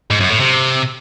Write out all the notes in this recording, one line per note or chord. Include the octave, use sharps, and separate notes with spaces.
G#2
F#2
A2
C3